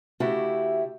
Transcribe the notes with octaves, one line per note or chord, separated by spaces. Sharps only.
C#3 A3 E4 F#4 G4